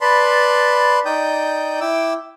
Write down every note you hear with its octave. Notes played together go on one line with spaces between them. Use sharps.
B4 D5 A5 B5 C6
D#4 D5 G5 D#6 G6
E4 G5 D6 E6